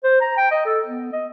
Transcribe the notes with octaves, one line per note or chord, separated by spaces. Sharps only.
C5
A#5
G5
D#5
A4
B3
D#5